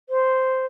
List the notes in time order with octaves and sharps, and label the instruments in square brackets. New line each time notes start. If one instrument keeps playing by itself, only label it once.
[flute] C5